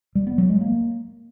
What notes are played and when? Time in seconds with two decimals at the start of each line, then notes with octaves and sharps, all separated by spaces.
0.15 G3
0.27 B3
0.38 F#3
0.49 G#3
0.61 A#3